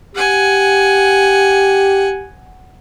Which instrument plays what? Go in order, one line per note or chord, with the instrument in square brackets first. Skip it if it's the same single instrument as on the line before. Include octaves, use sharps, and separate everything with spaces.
[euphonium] G4 [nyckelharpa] F#5 G#5